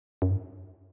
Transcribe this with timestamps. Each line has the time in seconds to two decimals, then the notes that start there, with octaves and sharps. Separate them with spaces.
0.22 F#2
0.31 G2